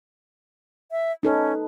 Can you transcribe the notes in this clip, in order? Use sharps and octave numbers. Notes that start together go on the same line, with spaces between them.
E5
C#4 D#4 A4 B4